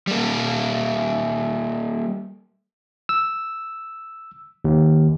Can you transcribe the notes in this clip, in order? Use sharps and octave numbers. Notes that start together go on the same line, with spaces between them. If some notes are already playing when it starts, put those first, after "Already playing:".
G3 A#3
E6
D#2